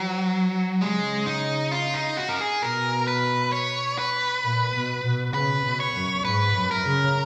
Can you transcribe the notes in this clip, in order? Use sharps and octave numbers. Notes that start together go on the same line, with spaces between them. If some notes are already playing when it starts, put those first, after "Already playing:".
Already playing: F3 F#3
C#3 G#3
D#4
F4
D#4
F#4
A#4
G#4
B2 A#4
B4
C#5
B4
A#2
B2
B2
C#3 B4
B2
C#5
F#2
G#2 B4
F#2
A#4
C#3